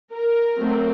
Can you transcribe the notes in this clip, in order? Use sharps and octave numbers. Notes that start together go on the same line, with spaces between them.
A#4
F#3 A3 C4